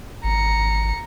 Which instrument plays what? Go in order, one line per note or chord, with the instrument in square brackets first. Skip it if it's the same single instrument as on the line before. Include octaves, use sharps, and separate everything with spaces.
[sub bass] G#1 [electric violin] A#5 C#7